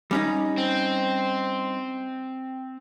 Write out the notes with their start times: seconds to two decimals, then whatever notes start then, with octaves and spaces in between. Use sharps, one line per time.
0.11 G3 C#4 D#4
0.57 C4